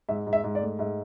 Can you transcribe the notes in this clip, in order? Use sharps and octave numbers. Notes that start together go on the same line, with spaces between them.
G#2 E5
G#2
E5
G#2
D5
A3
G#2 E5